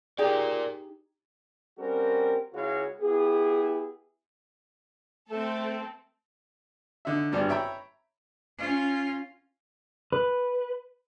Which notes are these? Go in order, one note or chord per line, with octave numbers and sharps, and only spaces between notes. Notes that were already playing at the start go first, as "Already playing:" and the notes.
D#4 G4 G#4 A#4 D5
G3 C4 C#4 F#4 A#4
C#2 G#3 E4 F#4 C#5 F5
B3 E4 G4 G#4
A3 C4 A4
D3 D#4 E5
G#1 G2 G3 B3 D5
C#5 E5 G5 A#5 B5
C#4 F4
B4